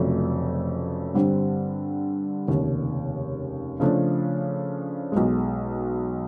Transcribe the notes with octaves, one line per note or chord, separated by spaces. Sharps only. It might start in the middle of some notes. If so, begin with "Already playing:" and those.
Already playing: F1 F2 C#3 F#3 A3
G2 D3 G3 C4
F1 D#2 C#3
C#3 F3 A3 D4
B1 B2 G#3